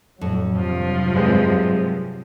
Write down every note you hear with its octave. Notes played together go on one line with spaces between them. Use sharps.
F2 A2 F#3
G2 C3 F3 F#3
G#3 C4 B4